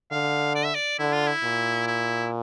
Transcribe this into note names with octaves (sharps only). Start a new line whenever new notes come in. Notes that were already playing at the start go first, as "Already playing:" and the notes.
D3 F5
D5
E5
D5
D3 E4
F4
E4
A#2
E4